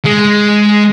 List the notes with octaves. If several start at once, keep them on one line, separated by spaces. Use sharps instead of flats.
G#3